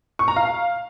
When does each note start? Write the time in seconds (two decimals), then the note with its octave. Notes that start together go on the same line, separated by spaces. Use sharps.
0.19 C#6
0.28 A#5
0.36 F5